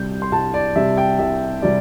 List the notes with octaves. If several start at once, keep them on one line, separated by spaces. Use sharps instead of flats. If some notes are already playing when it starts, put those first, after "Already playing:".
Already playing: C2 C3 G3 G6
C6
C2 A5
D5
C3 G3 E5
G5
C2 E5
C3 G3 D5